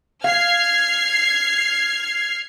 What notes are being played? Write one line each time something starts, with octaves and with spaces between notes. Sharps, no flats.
F5 F6 G#6 C7